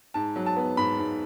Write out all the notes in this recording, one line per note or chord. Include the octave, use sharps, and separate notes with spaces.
G#2 A5
F#3
A5
B3
G#2 B5
G#2